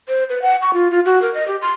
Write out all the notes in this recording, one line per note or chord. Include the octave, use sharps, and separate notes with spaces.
C5
B4
F#5
C#6
F4
F4
F#4
A#4
D#5
G4
C6